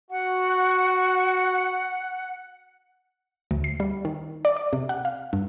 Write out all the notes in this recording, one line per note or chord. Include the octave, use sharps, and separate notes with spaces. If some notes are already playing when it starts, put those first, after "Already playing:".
F#4 F#5
D2
C7
G3
D#3
D5
D6
C3
F#5
F5
G2